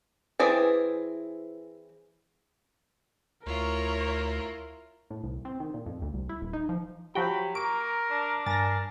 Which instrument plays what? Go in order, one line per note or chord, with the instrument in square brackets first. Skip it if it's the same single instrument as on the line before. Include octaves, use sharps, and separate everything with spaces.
[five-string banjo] E3 C4 G#4 D5
[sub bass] D2 [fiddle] E4 F4 [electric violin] A#4 [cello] C#5
[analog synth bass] A2
C2
C4
D#3
A#2
F2
D2
C2
E4
D#1
D#4
F3
[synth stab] F3 F#4 G5 [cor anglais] F#3 [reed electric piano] G4 [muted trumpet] B5
[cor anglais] A#3 [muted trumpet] A#4 [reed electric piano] A#5 C#6 [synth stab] D7
[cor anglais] D4
[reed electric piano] G2 G#5 [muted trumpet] A#4 [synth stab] A6 A#6